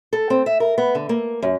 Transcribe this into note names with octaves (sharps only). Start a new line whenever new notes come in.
A4
C4
E5
A#4
B3
D3
A#3
F#2